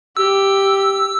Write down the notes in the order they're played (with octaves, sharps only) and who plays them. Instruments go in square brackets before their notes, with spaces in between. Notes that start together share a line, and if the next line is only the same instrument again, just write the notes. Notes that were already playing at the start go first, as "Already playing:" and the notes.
[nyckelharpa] G4 [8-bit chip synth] E6